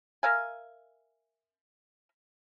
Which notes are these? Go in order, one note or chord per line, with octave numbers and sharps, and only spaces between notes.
A#4 E5 F5 G#5